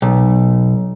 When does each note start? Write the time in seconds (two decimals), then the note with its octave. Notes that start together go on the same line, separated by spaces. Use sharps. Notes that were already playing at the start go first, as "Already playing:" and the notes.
0.02 B1